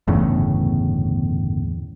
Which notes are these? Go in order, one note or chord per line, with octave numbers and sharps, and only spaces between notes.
G1 E2 A2 C#3